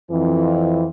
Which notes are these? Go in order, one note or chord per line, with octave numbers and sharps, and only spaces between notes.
F2 E3